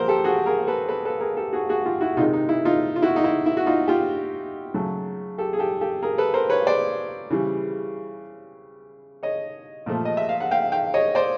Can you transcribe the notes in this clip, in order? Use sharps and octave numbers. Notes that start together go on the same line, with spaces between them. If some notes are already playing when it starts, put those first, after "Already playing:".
Already playing: A#2 F3 A#4 C5 F#5
G4 A4
F#4 G#4
G#4 A#4
A4 B4
A4 B4
A4 B4
G#4 A#4
G4 A4
F#4 G#4
F#4 G#4
F4 G4
E4 F#4
C3 D#3 G#3 D#4 F4
D#4
E4
D#4 F4
F4
E4 F#4
D#4
E4
E4
F#4
D#4 F4
F4 G4
C#3 F#3 A3
G4 A4
G#4
G4 A4
G4 A4
G#4 A#4
A4 B4
A#4 C5
B4 C#5
C5 D5
C#3 E3 G3
C#5 D#5
A#2 F3 A3
D#5
E5
F5
F#5
F5 G5
F5 G5
C#5 D#5
C5 D5